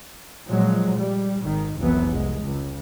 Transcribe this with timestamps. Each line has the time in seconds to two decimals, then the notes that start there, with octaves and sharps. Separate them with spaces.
0.48 A#2 F3 F#3 G#3
0.98 G3
1.44 G#1 D#3
1.78 F1 C2 E3 F#3 B3
2.12 C2 G#3
2.42 C#2